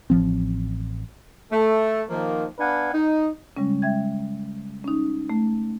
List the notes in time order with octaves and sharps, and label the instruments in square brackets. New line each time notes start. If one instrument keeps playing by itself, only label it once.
[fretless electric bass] A1 F3 C4
[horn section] A3
D#3 F3 A#3
B3 D4 B4 F5 F#5 G#5
D#4
[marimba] C#3 G3 G#3 C#4
G#3 E5 G5 G#6
C#4 D#4
A3